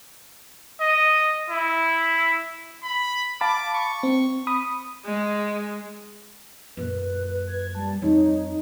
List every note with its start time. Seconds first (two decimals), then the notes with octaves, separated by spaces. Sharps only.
0.80 D#5
1.50 E4
2.83 B5
3.41 F5 A5 B5 D6
3.74 C#6
4.03 C4
4.47 B5 D#6
5.05 G#3
6.77 F#2 A#2 B4
7.47 G#6
7.75 G3 A5
8.02 F2 G3 D#4 C#5